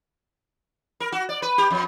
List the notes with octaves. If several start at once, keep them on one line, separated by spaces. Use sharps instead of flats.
A#4
F#4
D5
B4
G4
F2